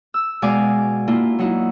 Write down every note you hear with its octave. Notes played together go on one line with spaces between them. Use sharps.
E6
B2 G#3 D5 F5 G#5 D6
A#3 D4 E4 F4
F#3 D#4 E4